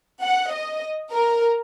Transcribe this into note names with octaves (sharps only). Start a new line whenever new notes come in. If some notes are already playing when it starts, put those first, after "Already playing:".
F#5
D#5
A#4